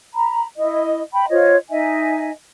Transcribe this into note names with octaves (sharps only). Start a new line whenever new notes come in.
A#5 B5
E4 D#5
G5 B5
F4 C5 C#5 D#5
D#4 D#5 E5 G#5